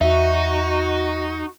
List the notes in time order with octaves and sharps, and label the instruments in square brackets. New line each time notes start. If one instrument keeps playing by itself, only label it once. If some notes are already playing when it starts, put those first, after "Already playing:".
[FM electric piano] E2 [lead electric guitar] D#4 [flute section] F#4 [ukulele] E5